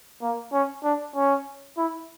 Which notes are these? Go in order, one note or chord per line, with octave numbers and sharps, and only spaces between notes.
A#3
C#4
D4
C#4
E4